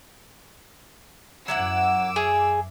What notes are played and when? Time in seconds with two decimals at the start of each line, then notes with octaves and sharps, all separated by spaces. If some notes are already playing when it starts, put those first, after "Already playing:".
1.48 F#2 F#3 E4 F#5 D6 E6
2.16 G#4 E5